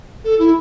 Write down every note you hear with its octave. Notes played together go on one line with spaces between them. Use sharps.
A4
E4